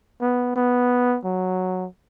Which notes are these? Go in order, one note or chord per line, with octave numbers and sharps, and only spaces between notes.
B3
B3
F#3